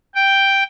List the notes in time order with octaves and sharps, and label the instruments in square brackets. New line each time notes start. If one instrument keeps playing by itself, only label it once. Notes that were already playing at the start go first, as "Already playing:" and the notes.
[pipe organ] G5